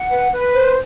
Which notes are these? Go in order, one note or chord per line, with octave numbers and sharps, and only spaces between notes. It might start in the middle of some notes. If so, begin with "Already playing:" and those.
Already playing: F#5
B4
B4
C5